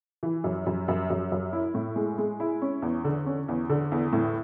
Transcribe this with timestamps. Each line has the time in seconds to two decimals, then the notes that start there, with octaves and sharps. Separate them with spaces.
0.23 E3
0.44 F#2
0.66 F#2
0.88 F#2
1.10 F#2
1.32 F#2
1.53 E4
1.74 A2
1.96 G#3
2.18 G#3
2.40 E4
2.62 C#4
2.82 E2
3.04 D3
3.26 C#4
3.48 E2
3.69 D3
3.92 E2
4.13 A2